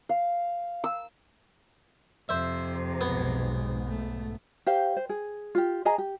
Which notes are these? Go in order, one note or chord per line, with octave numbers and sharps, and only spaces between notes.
F5
E6
F2 C3 C5 E5
B1 G#2 B3
A3
G4 C5 F5
C5
G#4
F4 G4
G#4 D#5 G#5 A#5
G4